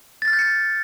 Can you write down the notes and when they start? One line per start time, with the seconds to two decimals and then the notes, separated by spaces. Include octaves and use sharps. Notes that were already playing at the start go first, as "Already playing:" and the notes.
0.22 A6
0.28 F6
0.33 G6
0.39 C#7